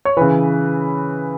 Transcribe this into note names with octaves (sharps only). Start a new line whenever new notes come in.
C#5
C#3 E3 B4